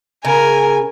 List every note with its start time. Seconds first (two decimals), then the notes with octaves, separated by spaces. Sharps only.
0.25 C#3 A#4 G#5